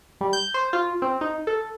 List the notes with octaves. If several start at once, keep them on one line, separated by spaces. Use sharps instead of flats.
G3
G6
C5
F4
C4
D#4
A4